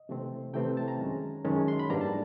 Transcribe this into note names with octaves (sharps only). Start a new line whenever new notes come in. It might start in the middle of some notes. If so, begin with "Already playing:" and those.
Already playing: D#5
C3 E3 A3 C4
C3 E3 A3 C4 G5
A5
A#5
F#2 D#3 G#3 C#4
F#2 D#3 G#3 C#4 A5
C6
B5
G#2 E3 G3 A#3 D4 A#5
A5